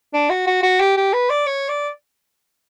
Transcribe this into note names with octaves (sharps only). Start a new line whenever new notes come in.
D4
F#4
F#4
F#4
G4
G4
B4
D5
C#5
D5